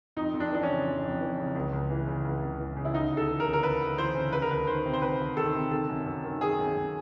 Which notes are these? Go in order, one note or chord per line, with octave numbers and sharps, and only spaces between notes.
F2 D#4
F2
D4
E3 D4
C#4
C#3
F2
F2
E3
C#3
C#2
C#2
E3
C#3
C#2
C#2
E3
C#3
E4
D2 D#4
D2
A4
E3
A#4
C#3
A#4
D2 B4
D2
E3 C5
C#3
D2 B4
A#4
D2 B4
D#3 C5
C3
C5
D2 B4
D2
D#3 A4
C3
D#3 A4
F#2
F#2
D#3
D#3 G#4
F#2
F#2